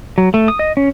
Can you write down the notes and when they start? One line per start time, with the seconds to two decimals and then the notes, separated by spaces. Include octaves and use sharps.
0.18 F#3
0.34 A3
0.48 D#6
0.59 D#5
0.77 C#4